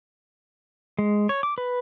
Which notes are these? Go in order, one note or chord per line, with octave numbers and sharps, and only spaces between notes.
G#3
C#5
D6
B4